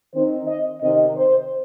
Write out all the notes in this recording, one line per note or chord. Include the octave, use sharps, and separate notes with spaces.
D#3 C4 D#4 C5
D#5
C3 D#3 C4 D#5
C5